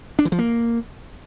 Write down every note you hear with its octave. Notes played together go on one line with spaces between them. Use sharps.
D4
E3
F3
A#3